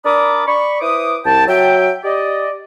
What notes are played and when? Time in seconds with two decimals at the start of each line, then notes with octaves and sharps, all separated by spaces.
0.04 D4 A#4 D5 B5 D6 D#6
0.46 D5 B5 C#6
0.81 E4 B4 C5 D6 D#6
1.25 C2 G5 A5
1.48 F#3 E5 G5
2.04 G4 D5 D#5